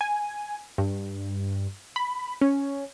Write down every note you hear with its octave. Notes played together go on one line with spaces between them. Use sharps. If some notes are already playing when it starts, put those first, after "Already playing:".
G#5
G2
B5
C#4